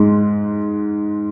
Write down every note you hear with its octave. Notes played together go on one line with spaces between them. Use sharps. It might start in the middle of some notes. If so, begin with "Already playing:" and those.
Already playing: G#2 G#3